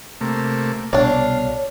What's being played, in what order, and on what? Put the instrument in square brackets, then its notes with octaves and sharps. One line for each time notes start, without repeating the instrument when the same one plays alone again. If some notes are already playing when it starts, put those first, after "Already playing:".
[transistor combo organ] C3 A3 A#3
[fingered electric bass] C2 B2 [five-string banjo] D4 D5 [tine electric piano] C#5 [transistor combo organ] F5